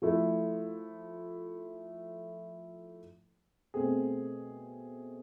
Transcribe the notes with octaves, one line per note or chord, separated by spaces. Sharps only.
F3 A3 E4 A4
B2 A3 C4 G#4